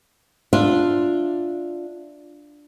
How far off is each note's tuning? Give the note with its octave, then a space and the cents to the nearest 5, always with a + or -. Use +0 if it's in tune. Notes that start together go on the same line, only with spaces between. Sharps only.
D4 +0 F4 +0 E5 +0